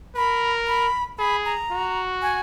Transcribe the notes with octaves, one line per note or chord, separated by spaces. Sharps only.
A#4 B5
B5
G#4 B5
A#5
F#4
G#5